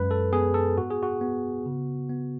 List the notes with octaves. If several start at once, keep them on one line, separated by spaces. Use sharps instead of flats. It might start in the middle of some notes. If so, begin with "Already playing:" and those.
Already playing: F#2 G#3 B4
A4
B3 G#4
A4
G#2 F#4
G#4
F#4
B3
C#3
B3